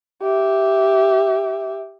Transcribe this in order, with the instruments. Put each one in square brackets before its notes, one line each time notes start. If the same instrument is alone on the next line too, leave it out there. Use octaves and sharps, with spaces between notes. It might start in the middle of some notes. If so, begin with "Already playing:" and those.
[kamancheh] G4 E5